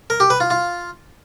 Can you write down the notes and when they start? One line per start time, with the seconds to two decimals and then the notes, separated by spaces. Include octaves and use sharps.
0.10 A#4
0.20 G4
0.30 B4
0.40 F4
0.50 F4